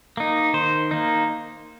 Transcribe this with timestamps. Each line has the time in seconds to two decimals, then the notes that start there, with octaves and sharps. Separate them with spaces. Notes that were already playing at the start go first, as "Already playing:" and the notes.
0.17 A#3 D#4
0.53 D#3 C5
0.91 A#3 D#4